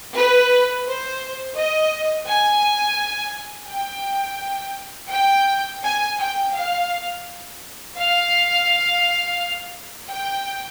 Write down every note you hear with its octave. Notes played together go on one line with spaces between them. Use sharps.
B4
C5
D#5
G#5
G5
G5
G#5
G5
F5
F5
G5